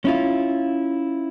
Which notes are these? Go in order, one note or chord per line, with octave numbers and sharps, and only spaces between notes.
C#4 E4 F4